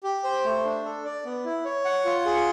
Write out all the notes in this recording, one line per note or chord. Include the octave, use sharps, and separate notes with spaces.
G4
C5
A3
D4
A4
D5
B3
E4
C#5
F#5
F4
G#4